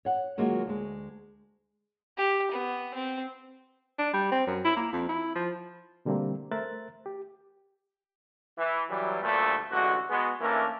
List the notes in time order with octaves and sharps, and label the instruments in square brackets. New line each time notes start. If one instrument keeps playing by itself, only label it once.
[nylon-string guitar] C#5 F#5
D#3 F#3 G#3 A#3 F4 F#4
D2 G#3
[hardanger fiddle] G4
B3
C4
[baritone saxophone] D4
G3
C4
F#2
E4
A#3
F2
E4
F3
[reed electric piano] B2 D3 G3 A3 A#3 C4
A3 A#4 C5 E5 F#6 A6
G4
[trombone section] E3
E3 F#3 G3
D2 G2 A#2 A3
A1 D3 G#3 F#4
G#3 B3 F#4
E3 A3 A#3 C#4 D4 A#4